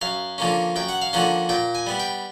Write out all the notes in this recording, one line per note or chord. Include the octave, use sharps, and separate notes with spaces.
F#2 F5
D3 F3 A#3 C#4
F#2 G5
F#5
F5
D3 F3 A#3 C#4 F#5
A#2 G5
G#5
G3 B3
G5